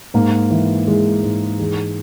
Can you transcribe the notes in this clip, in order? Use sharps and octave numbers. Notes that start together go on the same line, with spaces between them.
G#2 A#3
E3
E3 G#3
G#2
E3 G#3